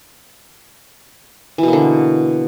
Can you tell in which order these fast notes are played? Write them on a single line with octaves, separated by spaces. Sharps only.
E3 B2 A#3 D3